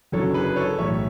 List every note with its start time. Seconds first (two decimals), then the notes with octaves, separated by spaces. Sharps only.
0.12 F#1 F#2 D3 F#3 A4 C#5
0.34 G#4 B4
0.56 A4 C#5
0.78 B1 A2 E3 C#5 E5